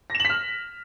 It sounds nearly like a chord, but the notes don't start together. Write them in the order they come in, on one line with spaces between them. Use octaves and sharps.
A#6 E7 F#7 B6 F6